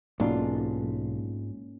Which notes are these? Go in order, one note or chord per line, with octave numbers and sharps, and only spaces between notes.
B1 G#2 A#3 C#4 D4 F4